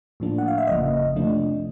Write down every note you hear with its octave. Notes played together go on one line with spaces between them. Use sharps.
A2 F3 A#3 D4
F#5
F5
E5
G1 F2 C#3 F3 A#3 D#5
C2 C3 F3 A3 D4